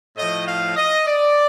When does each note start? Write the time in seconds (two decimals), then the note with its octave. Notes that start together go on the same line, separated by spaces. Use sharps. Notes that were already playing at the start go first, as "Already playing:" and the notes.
0.17 A2 F3 D#5
0.47 F5
0.76 D#5
1.07 D5